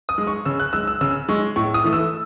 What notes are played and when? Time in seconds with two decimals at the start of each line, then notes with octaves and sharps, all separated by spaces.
0.09 D#6
0.18 G#3
0.27 C#6
0.45 C#3 E6
0.60 F#6
0.73 G#3 E6
0.87 E6
1.01 C#3 E6
1.29 G#3 C#6
1.56 A2 C#6
1.74 D#6
1.84 E3 A3
1.93 E6